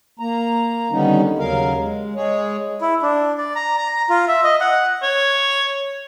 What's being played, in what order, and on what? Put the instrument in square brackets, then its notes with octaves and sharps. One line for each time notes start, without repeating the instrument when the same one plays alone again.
[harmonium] A#3 A#5
D3 D#3 G3 B3 C#4 D#4
D#2 C#3 F#3 A#4 F5
G#3
G#3 G#4 C#5
[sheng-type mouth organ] E4
D4
D5
A#5
A#5
F4
E5
D#5
F#5
[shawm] C#5